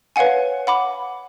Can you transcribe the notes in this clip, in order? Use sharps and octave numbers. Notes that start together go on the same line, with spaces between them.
B4 C#5 F5 F#5 G#5
F#5 B5 D6